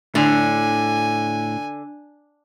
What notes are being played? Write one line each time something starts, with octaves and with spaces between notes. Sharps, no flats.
A2 D3 D4 G#5